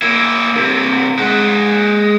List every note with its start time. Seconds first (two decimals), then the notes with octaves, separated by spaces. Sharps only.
0.02 A#3 E4
0.55 G2 C3
1.18 G#3 F#5